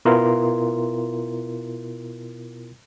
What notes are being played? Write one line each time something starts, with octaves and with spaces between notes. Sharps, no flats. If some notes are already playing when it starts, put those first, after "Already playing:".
B2 B3 E4 F4 A#4 C6